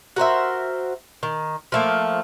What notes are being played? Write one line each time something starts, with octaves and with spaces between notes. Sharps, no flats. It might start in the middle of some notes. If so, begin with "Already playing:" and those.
F#4 A#4 C5 E5
D#3
F3 A3 A#3